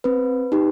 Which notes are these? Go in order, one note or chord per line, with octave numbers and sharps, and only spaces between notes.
C4 B4
D#4 G4